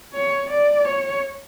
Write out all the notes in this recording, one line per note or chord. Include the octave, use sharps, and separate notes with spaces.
C#5
D5
C#5